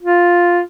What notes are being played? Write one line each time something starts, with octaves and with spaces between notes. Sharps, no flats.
F4